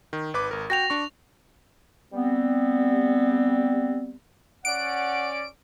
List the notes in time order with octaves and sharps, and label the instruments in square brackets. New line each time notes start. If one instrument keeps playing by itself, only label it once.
[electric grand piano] D#3
G#1 B4 D6
G#1 A#4
[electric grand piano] F#4 G5 [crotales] A#6 F7
[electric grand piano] D4 C#6
[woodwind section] G3 B3 C4
[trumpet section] C#4 D5 [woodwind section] F#5 [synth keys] D7